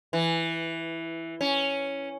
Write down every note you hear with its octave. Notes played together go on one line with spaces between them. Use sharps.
E3
C#4